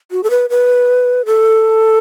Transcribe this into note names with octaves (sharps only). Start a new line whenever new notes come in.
F#4
A4
B4
B4
A4